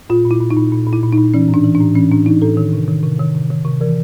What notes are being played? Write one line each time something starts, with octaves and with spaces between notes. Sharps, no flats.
A#2 F4
A#2
E4
A#2
D#4
A#2
A#2
A#2
E4
A#2
D#4
A#2
E3 C#4
A2
D4
E3
D4
A2
E3 C#4
A2 D4
E3 D#4
A2 A4
D#3
C3
D#3
C3
D#3
C3
D#3
C3
E3 A#4